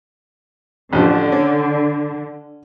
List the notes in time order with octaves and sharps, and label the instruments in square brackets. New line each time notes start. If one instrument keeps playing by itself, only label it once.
[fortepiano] A1 F3 [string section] D3
[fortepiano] C#4